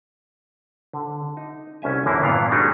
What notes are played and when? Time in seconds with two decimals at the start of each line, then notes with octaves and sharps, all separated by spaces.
0.93 D3
1.37 D#4
1.82 C2 C#4 E5 G#5
2.06 F#2 D3 E3 A#3 E4
2.22 G2 A#2 E3 B3 D5 F5
2.50 F#3 G3 A3 D4 D#4 G#4